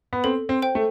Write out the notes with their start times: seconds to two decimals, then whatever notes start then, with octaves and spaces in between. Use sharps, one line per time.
0.13 B3
0.24 C4 A4
0.49 C4
0.62 C5 G5
0.75 A3